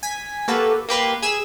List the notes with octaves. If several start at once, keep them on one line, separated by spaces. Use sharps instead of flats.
G#5 B6
A#3 F#4 G4 A4 B4
A#3 G4 B4 C6
G#4 G#5 E6